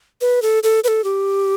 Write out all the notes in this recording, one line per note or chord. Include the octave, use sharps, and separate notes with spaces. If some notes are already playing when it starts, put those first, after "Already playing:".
B4
A4
A4
B4
A4
G4